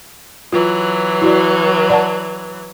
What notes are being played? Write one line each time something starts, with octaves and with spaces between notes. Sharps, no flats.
E3 F#3 F4
E4 F#4 D5
D5 F#5 A5